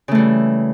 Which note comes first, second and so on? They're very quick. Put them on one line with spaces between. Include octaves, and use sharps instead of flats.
C#3 A3 E3 G3